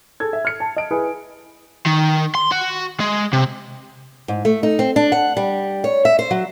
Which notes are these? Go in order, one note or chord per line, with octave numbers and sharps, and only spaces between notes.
G#4 A4 G#6
E5
F6 C#7
A5
D#5 D7
E4 G#4 B4
D#3
C6
F#4
G#3
C3
G#2
A3
D#4
C4
D4
F#5
G3
C#5
E5
C5
F#3